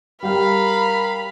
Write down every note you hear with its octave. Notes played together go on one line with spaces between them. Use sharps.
G3 A#4 F5 G5 B5